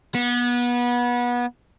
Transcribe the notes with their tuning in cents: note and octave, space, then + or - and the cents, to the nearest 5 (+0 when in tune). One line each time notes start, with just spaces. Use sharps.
B3 -25